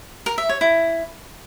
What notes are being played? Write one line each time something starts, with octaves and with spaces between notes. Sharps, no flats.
A#4
E5
C#5
E4